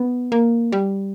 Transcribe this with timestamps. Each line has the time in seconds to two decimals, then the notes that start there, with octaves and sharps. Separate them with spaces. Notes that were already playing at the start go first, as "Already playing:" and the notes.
Already playing: B3
0.32 A#3
0.72 G3